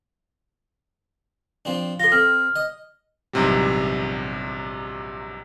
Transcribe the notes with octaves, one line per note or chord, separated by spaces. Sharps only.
F3 C4 D4
F4 A4 C6 A#6
C4 F6
D#5
A#1 E2 G#2 C3 F#3 G3